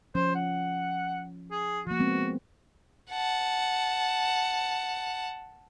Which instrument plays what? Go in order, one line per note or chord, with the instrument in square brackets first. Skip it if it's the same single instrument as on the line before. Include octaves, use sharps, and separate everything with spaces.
[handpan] F3 C#4 [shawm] C5
[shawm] F#5
G#4
[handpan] F3 A#3 [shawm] F#4
[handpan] G#3 B3 C4
[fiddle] F#5 A5